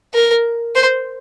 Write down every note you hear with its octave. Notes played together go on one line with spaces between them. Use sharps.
A#4
C5